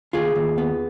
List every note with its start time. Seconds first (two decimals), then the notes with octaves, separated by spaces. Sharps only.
0.13 D#2 F4 G#4
0.35 D#2
0.58 B3